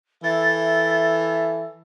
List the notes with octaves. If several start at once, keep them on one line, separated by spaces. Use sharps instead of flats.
E3 A4 E5 A6